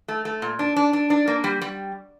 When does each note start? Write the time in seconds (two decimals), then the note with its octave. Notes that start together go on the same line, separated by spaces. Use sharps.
0.08 A3
0.25 A3
0.42 A#2
0.59 D4
0.76 D4
0.93 D4
1.10 D4
1.28 A#3
1.44 G3
1.61 G3